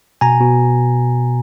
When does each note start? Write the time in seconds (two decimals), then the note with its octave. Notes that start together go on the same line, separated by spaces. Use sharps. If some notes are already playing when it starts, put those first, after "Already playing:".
0.21 B2 G#5 A#5
0.40 B2